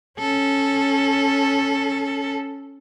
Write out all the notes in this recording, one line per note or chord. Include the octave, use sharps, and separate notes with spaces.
C#4 A4